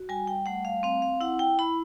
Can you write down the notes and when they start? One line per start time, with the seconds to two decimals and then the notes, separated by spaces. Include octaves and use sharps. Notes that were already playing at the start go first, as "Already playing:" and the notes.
Already playing: F#4
0.09 G3 G#5
0.27 G5
0.46 A3 F#5
0.65 F5
0.83 C4 F5
1.02 F5
1.21 E4 F#5
1.39 G5
1.59 E4 B5